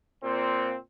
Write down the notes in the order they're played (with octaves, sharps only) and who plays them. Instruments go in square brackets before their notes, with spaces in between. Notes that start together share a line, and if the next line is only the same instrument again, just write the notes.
[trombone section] A#2 C4